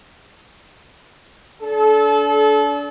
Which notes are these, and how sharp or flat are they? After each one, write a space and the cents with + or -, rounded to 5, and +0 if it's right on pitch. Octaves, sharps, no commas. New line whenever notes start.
D4 -30 A4 -30